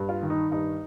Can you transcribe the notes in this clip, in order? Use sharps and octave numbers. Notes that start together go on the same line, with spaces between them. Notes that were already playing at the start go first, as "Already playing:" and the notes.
Already playing: G2
F4
D#3
D#4
G2 D#4